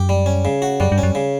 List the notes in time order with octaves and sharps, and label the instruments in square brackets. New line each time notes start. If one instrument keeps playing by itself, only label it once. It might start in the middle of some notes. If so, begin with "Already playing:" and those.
Already playing: [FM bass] F#2 [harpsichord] G4
[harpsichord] G3
C#4
C#3
F#4
[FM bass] F#2 [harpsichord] G3
[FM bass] G2
[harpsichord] C#4
[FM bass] F#2
[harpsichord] C#3